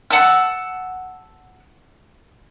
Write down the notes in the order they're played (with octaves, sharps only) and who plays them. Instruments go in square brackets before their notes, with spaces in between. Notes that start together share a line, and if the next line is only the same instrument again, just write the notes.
[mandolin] F#5 A5 E6